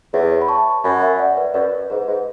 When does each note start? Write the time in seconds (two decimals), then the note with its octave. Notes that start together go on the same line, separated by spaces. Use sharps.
0.13 E2 C#5 E5
0.42 B5
0.48 A5 C#6
0.84 F#2 G#5 B5
1.01 E5 G#5
1.19 D5 F#5
1.37 B4 D5
1.54 F#2 B4 D5
1.90 G#2 B4
2.07 G#2